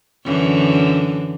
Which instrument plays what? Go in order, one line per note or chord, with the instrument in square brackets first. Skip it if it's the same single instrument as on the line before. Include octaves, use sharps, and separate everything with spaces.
[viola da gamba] F#2 D3 E3